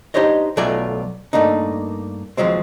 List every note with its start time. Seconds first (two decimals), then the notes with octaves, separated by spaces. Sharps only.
0.14 D4 D#4 G4 C5 C#5 D#5
0.57 B1 F#3 A3 F4 D5 G#5
1.33 G2 A3 A#3 D4 D#4
2.37 D#2 F3 F#3 G#3 C4